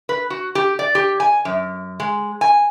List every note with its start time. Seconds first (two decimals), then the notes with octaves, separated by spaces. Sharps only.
0.09 B4
0.30 F#4
0.55 G4
0.79 D5
0.95 G4
1.20 G#5
1.45 F#2
2.00 G#3
2.41 G#5